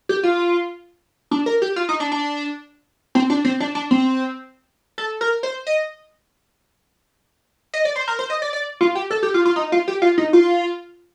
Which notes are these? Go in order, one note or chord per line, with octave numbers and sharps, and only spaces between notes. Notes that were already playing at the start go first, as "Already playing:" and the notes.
G4
F4
D4
A#4
G4
F4
D#4
D4
D4
C4
D4
C4
D4
D4
C4
A4
A#4
C5
D#5
D#5
D5
C5
A#4
C5
D#5
D5
D5
F4
G4
A4
G4
F4
F4
D#4
F4
G4
F4
D#4
F4